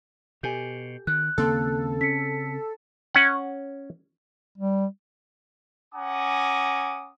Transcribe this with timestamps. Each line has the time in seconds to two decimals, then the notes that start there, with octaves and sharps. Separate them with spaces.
0.43 B2 G4 A4 G#5 G6
1.07 D#3 F#6
1.38 D#2 C#3 A#3 C4 A4 C6
2.01 C#4 B6 C#7
3.15 C#4 F#5
4.58 G3
5.94 C#4 F#5 G#5 A#5 D6 D#6